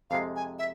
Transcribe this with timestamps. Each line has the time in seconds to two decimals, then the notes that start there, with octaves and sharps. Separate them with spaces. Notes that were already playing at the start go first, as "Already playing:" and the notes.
0.10 F2 C3 G#3 F5
0.36 G#5
0.59 E5